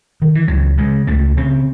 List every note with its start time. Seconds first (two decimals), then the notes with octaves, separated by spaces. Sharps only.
0.22 D#3
0.35 E3
0.48 C#2 F#3
0.78 C#3 G#3
1.07 C#2 A3
1.37 C#3 C4